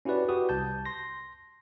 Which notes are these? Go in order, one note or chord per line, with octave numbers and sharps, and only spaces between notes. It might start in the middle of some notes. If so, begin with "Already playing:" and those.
C#4 E4 F#4 G4 B4 D5
F#4 G4 B4 D#6
C2 A5 G6
C6 A#6